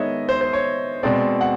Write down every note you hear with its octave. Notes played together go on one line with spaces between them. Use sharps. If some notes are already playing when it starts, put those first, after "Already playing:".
Already playing: D#3 G#3 B3 C#5 D#5 E5
C5
C5
C#5
B2 G#3 C4 D5
F#5